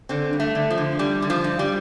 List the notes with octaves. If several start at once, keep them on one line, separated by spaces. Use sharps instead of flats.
D3 C4
G2
A3
D3
F3
D3
D3 G3
D3
F3
G2
G3